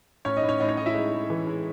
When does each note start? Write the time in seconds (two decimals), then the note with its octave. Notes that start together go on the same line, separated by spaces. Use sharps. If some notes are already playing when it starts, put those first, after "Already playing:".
0.25 A2 C#4 C#5
0.37 D#4 D#5
0.43 A2
0.49 C#4 C#5
0.60 A2 D#4 D#5
0.68 C#4 C#5
0.77 A2 D#4 D#5
0.86 E4 E5
0.95 G#3 D#4 D#5
1.12 G#3
1.30 E3
1.47 G#3